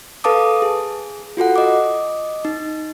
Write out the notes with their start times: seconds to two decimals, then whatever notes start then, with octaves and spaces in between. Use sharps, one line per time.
0.24 A4 B4 F5 A5 D6 D#6
0.62 G#4
1.37 F4 F#4 A4 F#5
1.56 D#5 D6
2.45 D#4